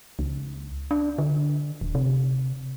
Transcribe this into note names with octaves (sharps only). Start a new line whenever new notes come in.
C#2
D4
D3
D#1
C3